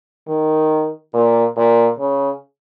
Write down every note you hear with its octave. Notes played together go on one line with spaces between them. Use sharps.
D#3
A#2
A#2
C#3